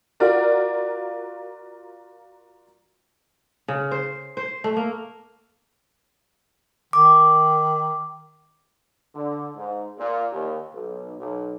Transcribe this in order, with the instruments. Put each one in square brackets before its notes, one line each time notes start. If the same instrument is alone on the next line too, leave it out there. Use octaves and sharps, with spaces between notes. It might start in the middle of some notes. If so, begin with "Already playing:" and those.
[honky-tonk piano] F4 F#4 A#4 D5 F#5
[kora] C#3
C5
C5
A3
A#3
[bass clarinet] D#3 [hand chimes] D6
[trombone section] D3
G#2
A#2
D#2
B1
B1